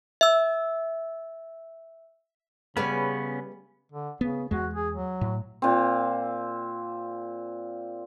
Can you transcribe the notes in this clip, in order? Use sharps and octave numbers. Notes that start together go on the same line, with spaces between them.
E5 E6
C#3 G3 B3 C#4 G#4 B4
D3
C#3 B3
E2 G#3 F#4
G#4
F#3
A2
A#2 C4